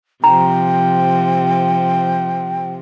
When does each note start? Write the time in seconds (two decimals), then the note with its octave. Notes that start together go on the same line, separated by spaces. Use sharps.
0.24 C3 F3 G5 A#5